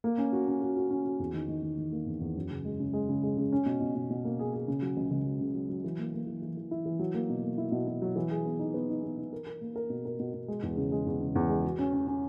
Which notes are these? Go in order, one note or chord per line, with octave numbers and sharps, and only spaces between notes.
A#3
C#4
F#4
C#4
F#4
F#4
C#4
F#4
E2
D#3
D#3
D#3
D#3
A#3
E2
E2
F#2
C#3
G#3
C#3
G#3
C#3
G#3
C#3
C#4
B2
B2
B2
B2
A#3
G#4
G#4
C#3
F#3
C#2
C#2
F#3
C#3
F#3
F#3
E3
A#3
A#3
E3
E3
E3
E4
E3
F#3
A#3
B2
A#3
E4
B2
B2
F#3
E3
G#4
B3
D#4
B3
D#4
B3
D#4
A#4
A#4
A#3
A#4
B2
A#4
B2
B2
G#3
E2
C#3
G#3
E2
C#3
E2
G#3
F#4
C#4
C#4
C#4